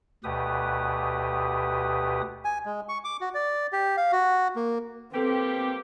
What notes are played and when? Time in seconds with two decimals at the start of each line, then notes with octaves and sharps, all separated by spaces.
0.24 D2 B2 G4 B4 D#6
2.45 G#5
2.66 G#3
2.89 C#6
3.04 D6
3.21 F#4
3.34 D5
3.73 G4
3.97 F5
4.12 F#4
4.56 A#3
5.13 G3 A#3 C4 G4 A4 B4 G5